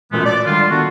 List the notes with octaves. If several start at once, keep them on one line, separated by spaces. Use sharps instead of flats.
F#2 A#2 E3 G#3 A3 B3
D5
D3 D#3 G3 G#3 F4
A3 B3 D4 F#4